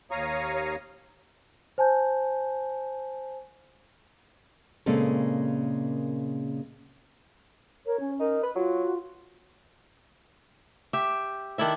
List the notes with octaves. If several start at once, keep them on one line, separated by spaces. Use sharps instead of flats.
D#2 C#5 F5 A#5 C#6 D#6
C5 G#5 A5 G6
A#2 C#3 G#3 A#3 C4 A4
A#4 C#5
C#4
D#4 A#4
B4
F#3 F4 F#4
G4 E5
D#3 D4 E4 E5